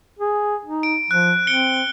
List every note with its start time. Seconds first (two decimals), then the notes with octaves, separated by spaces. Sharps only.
0.19 G#4
0.65 D#4
0.83 D7
1.11 F3 F#6
1.47 C4 C#7 D7 G7